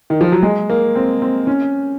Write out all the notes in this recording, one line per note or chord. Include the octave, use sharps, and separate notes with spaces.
D#3
F3
F#3
G#3
A#3
C4
C4
C#4